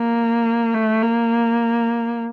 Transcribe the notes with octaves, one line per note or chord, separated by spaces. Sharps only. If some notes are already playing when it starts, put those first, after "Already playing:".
Already playing: A#3
A3
A#3